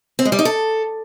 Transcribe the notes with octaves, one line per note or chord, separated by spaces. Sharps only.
C4
G#3
G3
D#4
A4